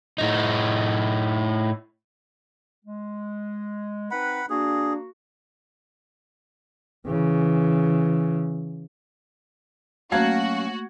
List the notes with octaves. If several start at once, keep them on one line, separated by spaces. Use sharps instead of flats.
A2 D#4
G#3
C4 D#4 B4 F#5 B5
A#3 D4 F#4 G#4
C#3 E3
F#3 A3 A#3 C#4 F#4 F5 G#6